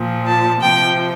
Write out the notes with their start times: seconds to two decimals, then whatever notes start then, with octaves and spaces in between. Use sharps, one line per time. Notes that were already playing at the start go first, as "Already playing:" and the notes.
Already playing: A#2 F3
0.26 A5
0.61 C3 F3 G5